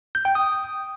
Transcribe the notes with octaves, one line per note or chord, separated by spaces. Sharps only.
G6
G5
D#6